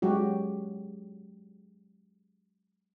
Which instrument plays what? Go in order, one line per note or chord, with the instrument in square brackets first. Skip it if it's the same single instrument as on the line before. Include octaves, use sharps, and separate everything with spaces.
[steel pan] F#3 G#3 F#4 G4